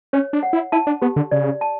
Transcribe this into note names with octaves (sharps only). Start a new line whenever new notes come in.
C#4 C#5
D4
F#5
E4
E4 A5
D4
B3 G4
D3
C#3 D5
A5